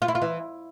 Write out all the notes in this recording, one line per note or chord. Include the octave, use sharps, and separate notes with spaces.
F4
E4
F4
E3